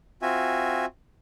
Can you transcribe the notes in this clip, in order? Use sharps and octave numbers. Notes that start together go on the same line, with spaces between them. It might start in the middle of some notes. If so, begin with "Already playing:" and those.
C4 F4 F#4 E5 G#5